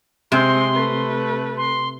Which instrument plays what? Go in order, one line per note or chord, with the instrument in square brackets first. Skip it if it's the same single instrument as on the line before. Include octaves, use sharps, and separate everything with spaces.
[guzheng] C3 [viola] G#3 C4 [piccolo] C6
[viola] A3 B4
[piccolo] C6